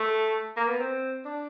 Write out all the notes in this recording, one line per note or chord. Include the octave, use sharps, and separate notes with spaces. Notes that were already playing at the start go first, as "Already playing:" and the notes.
Already playing: A3
A#3
B3
C4
D4